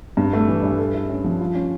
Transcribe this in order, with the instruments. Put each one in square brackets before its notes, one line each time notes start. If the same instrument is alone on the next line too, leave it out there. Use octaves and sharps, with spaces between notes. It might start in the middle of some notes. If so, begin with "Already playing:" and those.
[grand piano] G2
A3
E3
G2
A4
E4
C#4
F3
F4
C#4